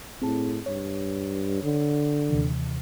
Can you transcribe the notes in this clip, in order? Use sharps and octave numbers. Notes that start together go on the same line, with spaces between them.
A2 C4 G#4 A5
G2 C#5
D3
D#2 C3 E3